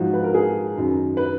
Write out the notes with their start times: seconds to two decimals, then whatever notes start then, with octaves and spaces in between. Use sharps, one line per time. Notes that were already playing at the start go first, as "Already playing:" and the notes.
Already playing: G#2 F3 F#4
0.14 B4
0.24 A#4
0.34 G#4
0.76 F#2 D#3
1.17 B4